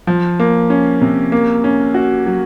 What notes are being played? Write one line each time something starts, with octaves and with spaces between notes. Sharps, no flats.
F3
A#3
C#4
C3
A#3
C#4
F#4
F#3